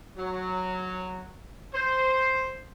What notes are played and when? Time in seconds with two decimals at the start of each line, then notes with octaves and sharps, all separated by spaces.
0.17 F#3
1.74 C5